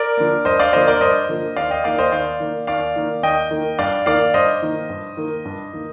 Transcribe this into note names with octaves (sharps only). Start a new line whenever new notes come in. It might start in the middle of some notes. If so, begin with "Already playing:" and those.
Already playing: A#4 D5
D3 F3 A#3
G2 C5 D#5
D5 F5
D3 F3 A#3 C5 D#5
A#4 D5
G2 C5 D#5
D3 F3 A#3
D#2 D5 F5
D#5 G5
D#3 A#3 D5 F5
C5 D#5
D#2 D5 F5
D#3 A#3
D#2 D5 F5
D#3 A#3
D#2 D#5 G5
D#3 A#3
G2 D5 F5
D#3 A#3 D5 F5
G2 C5 D#5
D#3 A#3
G2
D#3 A#3
G2
D#3 A#3